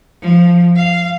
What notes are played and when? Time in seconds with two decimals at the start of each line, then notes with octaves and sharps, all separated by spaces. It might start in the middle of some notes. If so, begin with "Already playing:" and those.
0.22 F3
0.76 F5